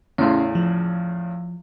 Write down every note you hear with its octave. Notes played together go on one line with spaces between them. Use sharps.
E2 A2 C#3 C#4 C6
F3